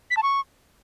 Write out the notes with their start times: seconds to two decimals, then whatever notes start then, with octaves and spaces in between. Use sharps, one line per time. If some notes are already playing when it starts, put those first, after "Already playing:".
0.10 B6
0.17 A5
0.23 C#6